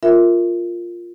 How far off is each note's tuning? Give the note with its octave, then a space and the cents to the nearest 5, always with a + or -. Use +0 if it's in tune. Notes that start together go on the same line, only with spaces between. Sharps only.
F4 +0 A#4 -5 E5 +0